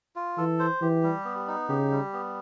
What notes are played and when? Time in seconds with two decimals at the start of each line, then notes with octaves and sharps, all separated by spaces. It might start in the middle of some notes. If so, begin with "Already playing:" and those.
0.16 F4
0.38 E3 A4
0.59 C5
0.82 E3 G4
1.03 G3
1.25 B3
1.48 D#4
1.69 C#3 G4
1.91 G3
2.13 B3